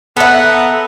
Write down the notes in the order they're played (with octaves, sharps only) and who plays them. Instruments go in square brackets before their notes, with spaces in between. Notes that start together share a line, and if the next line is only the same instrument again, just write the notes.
[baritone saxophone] B3 [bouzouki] A4 E5 [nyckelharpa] F#5 A#5